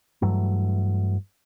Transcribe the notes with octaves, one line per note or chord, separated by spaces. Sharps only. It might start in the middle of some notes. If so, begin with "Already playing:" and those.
G2 E3 F#3 A3